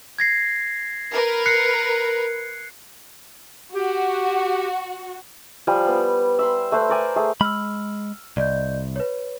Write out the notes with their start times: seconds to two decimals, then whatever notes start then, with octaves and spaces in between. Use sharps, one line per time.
0.19 G#6 A#6 C7
1.11 A#4 B4
1.46 F#6 C7 C#7
3.74 F#4 G4
5.67 F3 G3 G#5
5.87 B3
6.39 E5 B5 C6
6.72 A3 B4 C5
6.89 A#4 D5 G#5
7.16 A3 G#4
7.41 G#3 B5 E6 F6
8.37 C2 D5 D#5 G6
8.96 B4 C#5